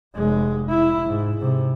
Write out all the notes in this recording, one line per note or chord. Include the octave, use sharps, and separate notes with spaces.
F1 G#3
E4
G#2
G#2 C3